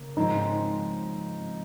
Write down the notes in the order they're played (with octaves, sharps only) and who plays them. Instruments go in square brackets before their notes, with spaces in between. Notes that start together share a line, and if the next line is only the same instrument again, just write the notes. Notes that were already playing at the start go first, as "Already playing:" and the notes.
Already playing: [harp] C#3 A#3
[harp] G#2 F3 G#3 C4 [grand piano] D#4